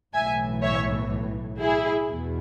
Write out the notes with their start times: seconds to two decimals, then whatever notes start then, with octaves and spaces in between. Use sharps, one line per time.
0.14 B1 A2 E3 E5 G#5
0.62 C#5 E5
1.59 E4 G#4
2.08 E2 B2